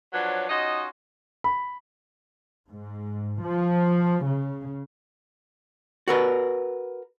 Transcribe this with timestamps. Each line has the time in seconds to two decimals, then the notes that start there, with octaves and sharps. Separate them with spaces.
0.13 F3 F#3 D4 B4 C#5
0.49 C#4 D#4 F4 F#4 D#5
1.44 B5
2.69 G#2
3.42 F3
4.25 C#3
6.08 F#4 A#4 B4